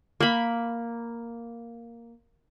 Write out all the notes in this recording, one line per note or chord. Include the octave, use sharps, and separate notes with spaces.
A#3 B5